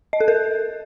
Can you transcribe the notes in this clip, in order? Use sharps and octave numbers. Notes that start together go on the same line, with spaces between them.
D#5
A4
A#4